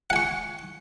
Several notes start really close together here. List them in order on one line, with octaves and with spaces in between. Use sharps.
F#5 G#5 C#6